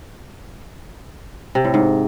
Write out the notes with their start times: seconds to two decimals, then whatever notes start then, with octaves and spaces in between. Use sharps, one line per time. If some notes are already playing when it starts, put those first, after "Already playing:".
1.55 C3
1.64 A2
1.74 G#2